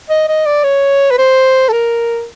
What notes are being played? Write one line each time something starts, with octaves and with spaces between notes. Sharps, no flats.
D#5
D#5
D5
C#5
B4
C5
A4
A#4